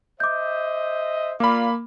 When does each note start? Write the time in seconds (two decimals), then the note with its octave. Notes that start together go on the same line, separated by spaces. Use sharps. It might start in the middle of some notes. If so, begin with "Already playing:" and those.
0.20 C5 D#5 E5 D6 G6
1.40 A#3 F4 D5 F5 B5 D6